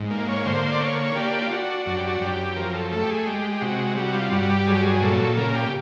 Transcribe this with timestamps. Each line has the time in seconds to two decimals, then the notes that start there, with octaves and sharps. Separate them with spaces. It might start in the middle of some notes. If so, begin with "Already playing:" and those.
Already playing: G#2
0.11 A#3
0.28 C#5
0.46 D3 C5
0.71 D5
0.81 A#3 C#5
1.16 D4 G4
1.41 F4
1.51 D4 F#4
1.86 F#2 F#4
1.97 G4
2.07 F#4
2.21 F#2 G4
2.56 F3 A#4
2.74 A4
2.92 A3 A4
3.02 G4
3.09 G#4
3.27 G#3 G4
3.52 G4
3.61 C3 F#4
3.96 G3 F#4
4.14 F4
4.32 G2 F#4
4.50 G4
4.67 F#3 G#4
4.75 G4
4.83 G#4
5.01 A#2 A4
5.37 C#3 A#4
5.55 G4